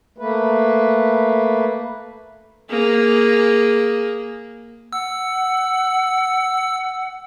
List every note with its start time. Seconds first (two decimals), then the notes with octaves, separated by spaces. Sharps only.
0.18 A3 A#3 B4
2.70 A#3 G#4
4.93 F#5 E6